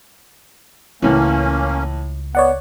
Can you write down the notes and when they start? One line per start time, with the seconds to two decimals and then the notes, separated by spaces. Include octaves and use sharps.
1.02 C#2 A2 E3 A#3 C#4
2.35 B3 C#5 D5 F#5